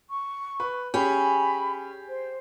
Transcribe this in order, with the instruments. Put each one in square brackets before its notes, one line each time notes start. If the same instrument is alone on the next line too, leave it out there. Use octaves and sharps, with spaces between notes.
[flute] C#6
[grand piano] B4
[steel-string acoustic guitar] C#4 [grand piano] G4 G#4 [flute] B5
[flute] C5